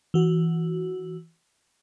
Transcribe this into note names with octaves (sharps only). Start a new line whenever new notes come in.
E3 F#4